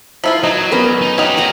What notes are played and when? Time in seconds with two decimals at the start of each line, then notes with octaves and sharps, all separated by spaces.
0.24 F3 E4 F4 B4
0.44 F#3 D#4
0.71 B3 C#4 A#4
1.01 D#4
1.18 D#4 F#4 G4 C#5 F5
1.37 F#5 G#5 A#5